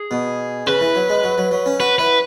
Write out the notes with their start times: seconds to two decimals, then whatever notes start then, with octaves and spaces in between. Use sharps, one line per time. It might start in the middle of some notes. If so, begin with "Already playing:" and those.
Already playing: G#4
0.11 B2
0.67 C#3 B4
0.81 E3
0.95 F#3
1.09 G#3
1.23 F#3
1.38 F#3
1.51 F#3
1.66 C#4
1.80 F#4 B4
1.99 E4 B4